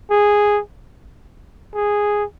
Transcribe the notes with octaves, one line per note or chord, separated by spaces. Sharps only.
G#4
G#4